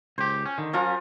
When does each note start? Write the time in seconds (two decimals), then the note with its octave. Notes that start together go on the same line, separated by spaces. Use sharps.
0.18 C#2 G4 C5
0.46 C#4
0.58 D3 D#3
0.73 F3 F#3 C#4 F4 A#4